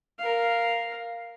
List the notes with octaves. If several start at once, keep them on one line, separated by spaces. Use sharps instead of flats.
A#4 F5